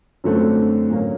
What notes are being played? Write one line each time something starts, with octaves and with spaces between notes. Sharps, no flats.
F#2 D3 F#3 A3 C4
A#2 F#3 A#3 C#4